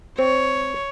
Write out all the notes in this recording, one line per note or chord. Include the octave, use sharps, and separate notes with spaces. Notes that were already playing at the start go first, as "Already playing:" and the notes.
C4 C#5